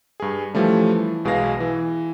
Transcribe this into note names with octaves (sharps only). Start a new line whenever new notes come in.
G2 G#4
E3 F3 G3 A3 C#4
E3
B1 B2 G#3 G#4 F5 A#6
E3